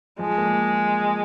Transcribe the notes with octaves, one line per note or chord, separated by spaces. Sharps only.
F3 G#3
A#3